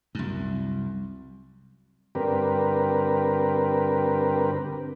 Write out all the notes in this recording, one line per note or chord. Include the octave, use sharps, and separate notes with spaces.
C2 F#2
G2 D3 C4 G4 A#4 B4